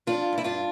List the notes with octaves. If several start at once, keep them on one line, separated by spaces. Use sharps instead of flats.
F3 D4 F4
G2 E4
D4 F4